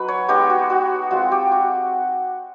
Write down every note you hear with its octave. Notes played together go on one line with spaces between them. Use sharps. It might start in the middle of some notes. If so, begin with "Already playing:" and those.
Already playing: F#3 D#4 B4
C#5
G#3 B3 D#4 G4
F#4
F#4
G#3 C4 F4 F#4
G4
F#4